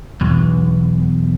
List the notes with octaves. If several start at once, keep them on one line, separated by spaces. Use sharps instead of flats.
B1 E2